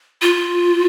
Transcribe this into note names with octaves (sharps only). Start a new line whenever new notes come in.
F4